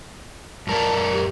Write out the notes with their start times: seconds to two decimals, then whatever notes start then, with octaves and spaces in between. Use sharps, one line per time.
0.67 F#2 A#4 D5 A5
1.13 G4